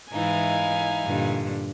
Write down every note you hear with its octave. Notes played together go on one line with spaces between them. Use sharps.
G#2 E3 D#4 E4 F5 G#5
G2 A#2 D3